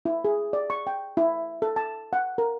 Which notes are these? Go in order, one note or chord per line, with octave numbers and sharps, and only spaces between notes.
E4
G#4
D5
C#6
G5
E4
A4
A5
F#5
A#4